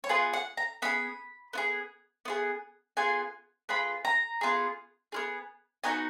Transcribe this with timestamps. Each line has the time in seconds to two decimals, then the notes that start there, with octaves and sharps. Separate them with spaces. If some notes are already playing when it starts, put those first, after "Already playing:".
0.04 C#5
0.09 B3 F4 G#4 B4
0.33 F#5
0.57 A#5
0.82 B3 F4 G#4 B5
1.53 B3 F4 G#4
2.25 B3 F4 G#4
2.97 B3 F4 G#4 G#5
3.69 B3 F4 G#4 B5
4.05 A#5
4.41 B3 F4 G#4
5.12 B3 F4 G#4
5.84 B3 D#4 F#4 G#5